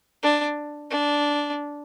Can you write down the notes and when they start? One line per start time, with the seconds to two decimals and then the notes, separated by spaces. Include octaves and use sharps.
0.23 D4
0.90 D4